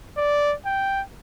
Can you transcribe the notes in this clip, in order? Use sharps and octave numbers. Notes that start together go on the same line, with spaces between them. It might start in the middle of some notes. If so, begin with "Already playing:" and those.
D5
G5